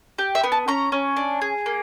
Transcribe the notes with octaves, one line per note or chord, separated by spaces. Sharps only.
G4
E5
B3
A5
C#4 A#5
C#4
D4
G#4
A#3